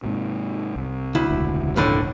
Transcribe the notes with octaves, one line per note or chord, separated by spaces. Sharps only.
G#2 C3
C2
D2 E4
E1 C#2
F2 A2 D3